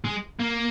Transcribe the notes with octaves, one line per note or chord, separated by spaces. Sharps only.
G#3
A#3